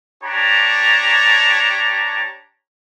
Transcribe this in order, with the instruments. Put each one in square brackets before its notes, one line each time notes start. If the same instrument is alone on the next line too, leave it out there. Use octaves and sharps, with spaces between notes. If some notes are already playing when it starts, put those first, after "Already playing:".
[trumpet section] D4 G4 C#5 A5 A#5